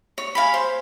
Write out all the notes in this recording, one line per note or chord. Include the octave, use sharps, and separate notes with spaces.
C#5
F5 G#5 B5
C5